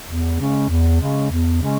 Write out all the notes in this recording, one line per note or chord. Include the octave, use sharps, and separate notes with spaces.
E2
C#3 G#3 C#4
E2
C#3 G#3 C#4
E2
C#3 G#3 C#4